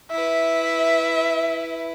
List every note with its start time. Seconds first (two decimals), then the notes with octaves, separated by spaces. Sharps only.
0.11 E4 B4 E5